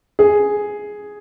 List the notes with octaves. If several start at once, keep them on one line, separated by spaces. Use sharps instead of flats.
G#4